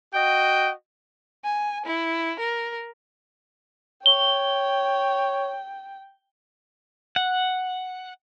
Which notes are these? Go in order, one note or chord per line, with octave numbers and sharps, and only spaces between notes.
F#4 D#5 G5
G#5
E4
A#4
C#5 G5 G7
F#5